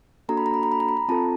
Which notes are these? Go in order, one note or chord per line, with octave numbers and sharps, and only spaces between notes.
A#3 D4 F#4 A4 A#5
B5
A#5
B5
A#5
B5
A#5
B5
A#5
C4 F4 A4 A5